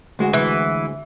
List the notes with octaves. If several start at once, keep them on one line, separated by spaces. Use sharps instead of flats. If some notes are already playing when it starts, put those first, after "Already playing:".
D2 G#3 F#4
E3